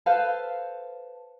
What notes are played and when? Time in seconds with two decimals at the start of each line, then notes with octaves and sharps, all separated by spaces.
0.06 A4 B4 C5 F5